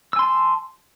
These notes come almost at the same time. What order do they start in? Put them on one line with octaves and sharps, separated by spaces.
E6 G#5 C6 A5